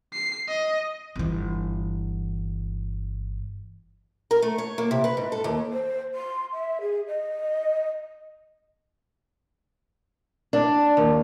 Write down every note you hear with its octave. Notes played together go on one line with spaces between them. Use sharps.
C7
D#5
G1 E3
A#4
A3
C#5
A#3
C3
B4
G#2
A4
D#2
C5
C6
E5
G#4
D#5
D4
D#2